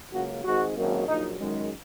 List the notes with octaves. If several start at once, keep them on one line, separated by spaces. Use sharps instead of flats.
C#2 C#3 F#3 A#3 F#4
G#1 G#2 G#3 F#4
G#1 F#2 D#3 F#3 A#3
A#1 A#2 F#3 D#4
F#2 D#3 G#3